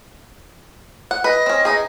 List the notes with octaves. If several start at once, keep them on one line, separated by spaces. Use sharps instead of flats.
F#5
B4 D#5
C4 C#4
E3 D#4 G#4